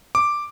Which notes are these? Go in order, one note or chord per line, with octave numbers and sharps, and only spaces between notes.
D6